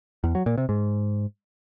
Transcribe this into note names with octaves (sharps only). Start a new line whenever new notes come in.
E2
F#3
A#2
C3
G#2